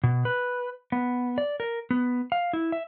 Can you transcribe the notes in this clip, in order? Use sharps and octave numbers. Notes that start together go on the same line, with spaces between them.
B2
B4
B3
D5
A#4
B3
F5
E4
E5